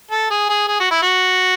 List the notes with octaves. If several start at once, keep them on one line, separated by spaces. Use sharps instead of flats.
A4
G#4
G#4
G#4
F#4
E4
F#4